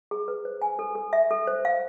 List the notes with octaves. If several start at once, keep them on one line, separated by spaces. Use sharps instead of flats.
G#4
B4
C5
G#5
A4
A4
E5
A4
C5
F5